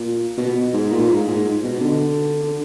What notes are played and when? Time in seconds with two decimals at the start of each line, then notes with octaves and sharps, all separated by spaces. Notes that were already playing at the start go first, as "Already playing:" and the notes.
Already playing: A#2
0.37 B2
0.73 G#2
0.92 A#2
1.09 G#2
1.27 G#2
1.63 B2
1.81 D3
2.43 D3